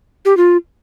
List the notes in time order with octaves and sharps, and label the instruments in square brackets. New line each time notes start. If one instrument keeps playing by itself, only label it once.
[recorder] G4
F4